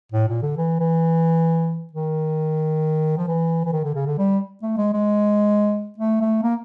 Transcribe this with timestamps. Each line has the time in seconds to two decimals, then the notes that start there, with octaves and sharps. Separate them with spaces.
0.12 A2
0.28 A#2
0.42 D3
0.57 E3
0.80 E3
1.93 D#3
3.18 F3
3.28 E3
3.65 E3
3.72 D#3
3.84 D3
3.95 C#3
4.06 D3
4.18 G3
4.63 A3
4.77 G#3
4.93 G#3
5.98 A3
6.21 A3
6.43 A#3